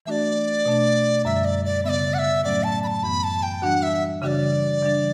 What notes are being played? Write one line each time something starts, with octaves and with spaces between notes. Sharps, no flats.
E3 A3 D4 F#4 D5 E5
B2 A3 D4
F#2 D3 G3 E5
D5
D5
C#3 G3 B3 D5 E5
F#5
E5
A2 F#3 A3 C#4 D5
A5
B5
A5
F#2 E3 B3 B5
A5
G5
E3 G3 D4 F#4 F#5
E5
C#3 E3 G3 D4 F#4 D5 E5
C#3 E3 G3 D4